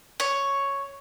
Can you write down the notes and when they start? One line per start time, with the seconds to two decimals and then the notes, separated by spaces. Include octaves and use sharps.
0.20 C#5